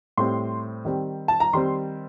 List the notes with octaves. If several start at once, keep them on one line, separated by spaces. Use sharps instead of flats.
A2 G3 C4 C6
D#3 G3 C4
A5
A#5
D#3 G3 C4 C6